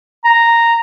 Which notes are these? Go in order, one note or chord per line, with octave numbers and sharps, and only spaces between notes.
A#5